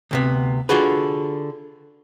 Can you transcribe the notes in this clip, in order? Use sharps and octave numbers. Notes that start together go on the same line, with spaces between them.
D2 C3 B3
D3 F4 F#4 G#4 B4